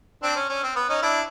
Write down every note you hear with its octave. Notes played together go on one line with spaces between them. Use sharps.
C4 D4
C#4
C#4
C4
B3
C#4 D#4
D4 E4